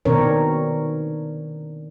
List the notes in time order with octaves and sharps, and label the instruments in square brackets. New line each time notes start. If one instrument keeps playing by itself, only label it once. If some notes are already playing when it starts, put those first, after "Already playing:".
[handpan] B2 D#3 C4 D4 A#4 C#5